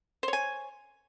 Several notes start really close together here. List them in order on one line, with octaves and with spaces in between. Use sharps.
C5 C#5 G#5